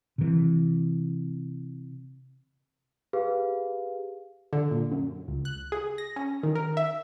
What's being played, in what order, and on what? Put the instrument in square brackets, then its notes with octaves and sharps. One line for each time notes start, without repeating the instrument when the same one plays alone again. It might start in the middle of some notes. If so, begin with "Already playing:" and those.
[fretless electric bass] C3 E3
[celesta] G4 G#4 B4 F5
[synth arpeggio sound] D3
A#2
F#2
C#2
F#6
G#4
A#6
C#4
D#3
A#4
E5